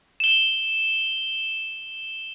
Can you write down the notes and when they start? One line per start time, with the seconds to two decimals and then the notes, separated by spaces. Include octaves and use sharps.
0.20 E7 G7